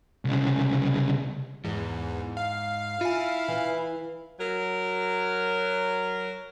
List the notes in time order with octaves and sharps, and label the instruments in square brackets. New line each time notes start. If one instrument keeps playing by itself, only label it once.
[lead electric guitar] C2 C#3
[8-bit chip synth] E2 [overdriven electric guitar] G#2
[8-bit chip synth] F5
[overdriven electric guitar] E4 [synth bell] F4 G#5
[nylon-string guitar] E3
[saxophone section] F#3 A#4